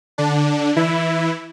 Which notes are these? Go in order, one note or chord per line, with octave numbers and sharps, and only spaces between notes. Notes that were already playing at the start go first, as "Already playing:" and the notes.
D3 D4
E3 E4